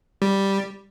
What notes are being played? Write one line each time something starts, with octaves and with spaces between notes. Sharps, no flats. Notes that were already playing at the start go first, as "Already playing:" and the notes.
G3